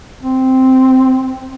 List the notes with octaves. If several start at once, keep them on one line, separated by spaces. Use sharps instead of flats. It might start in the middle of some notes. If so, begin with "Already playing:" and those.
C4